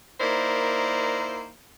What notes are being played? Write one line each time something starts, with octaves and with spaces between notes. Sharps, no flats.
A#3 D#4 E4 A#4 C5 D5